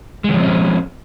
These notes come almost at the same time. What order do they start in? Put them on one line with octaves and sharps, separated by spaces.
G#3 D#3 F3 C4 C#4